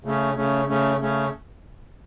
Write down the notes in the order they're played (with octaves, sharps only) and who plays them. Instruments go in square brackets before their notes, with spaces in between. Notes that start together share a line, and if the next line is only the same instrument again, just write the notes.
[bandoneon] C#3 A3 C#4
C#3 A3 C#4
C#3 A3 C#4
C#3 A3 C#4